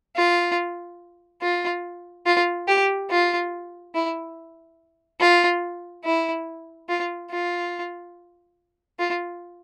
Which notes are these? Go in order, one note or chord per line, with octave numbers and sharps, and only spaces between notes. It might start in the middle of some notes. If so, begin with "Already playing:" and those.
F4
F4
F4
G4
F4
E4
F4
E4
F4
F4
F4